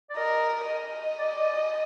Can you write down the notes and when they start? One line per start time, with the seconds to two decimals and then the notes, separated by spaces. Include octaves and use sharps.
0.10 D5
0.16 A#4 D#5
0.68 D#5
1.19 D5